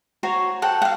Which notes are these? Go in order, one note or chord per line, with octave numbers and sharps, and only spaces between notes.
F#4 C5 C#5 A#5
A4 F#5 G5
F5 F#5